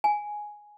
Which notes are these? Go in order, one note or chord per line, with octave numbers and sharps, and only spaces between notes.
G#5